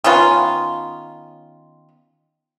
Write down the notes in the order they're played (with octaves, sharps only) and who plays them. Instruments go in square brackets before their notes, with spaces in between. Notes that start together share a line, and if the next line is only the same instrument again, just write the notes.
[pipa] D#3 B3 C#4 F4